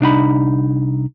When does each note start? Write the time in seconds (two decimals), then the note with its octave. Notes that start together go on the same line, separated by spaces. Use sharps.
0.01 C2 D4 D#4 B5